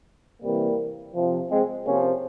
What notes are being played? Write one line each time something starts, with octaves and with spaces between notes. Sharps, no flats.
C3 E3 G3 A#3
C3 F3
G#3 C4
C3 F3 A#3 C#4